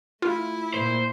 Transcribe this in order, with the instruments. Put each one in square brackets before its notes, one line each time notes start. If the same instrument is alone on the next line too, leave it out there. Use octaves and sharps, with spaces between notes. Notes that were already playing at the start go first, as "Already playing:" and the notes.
[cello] A3 E4 [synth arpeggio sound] F4
[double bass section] A#2 [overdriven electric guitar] C5